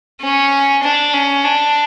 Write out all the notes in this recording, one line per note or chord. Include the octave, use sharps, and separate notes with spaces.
C#4
D4
C#4
D4